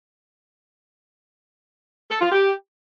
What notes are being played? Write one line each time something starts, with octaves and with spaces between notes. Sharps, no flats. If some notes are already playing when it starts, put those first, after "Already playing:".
A4
F4
G4